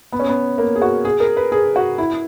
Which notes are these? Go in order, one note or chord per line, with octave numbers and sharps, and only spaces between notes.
B3
C#4
B3
A#3
G#4
F#4
G#4
A#4
B4
G#4
F#4
E4